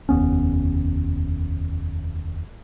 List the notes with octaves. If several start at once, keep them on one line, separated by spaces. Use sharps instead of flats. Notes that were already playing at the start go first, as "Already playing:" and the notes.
F1 D#2 B3 C#4